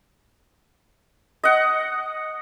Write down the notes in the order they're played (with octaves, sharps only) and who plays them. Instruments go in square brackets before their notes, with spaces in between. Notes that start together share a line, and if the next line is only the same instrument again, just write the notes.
[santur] D#5 F#5